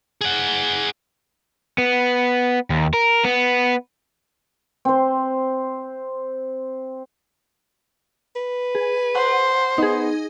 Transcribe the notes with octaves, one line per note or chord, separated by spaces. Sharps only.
G#4 F#5
B3
D#2
A#4
B3
C4 C5
B4
G#4
C5 F#5
B3 D#4 G#4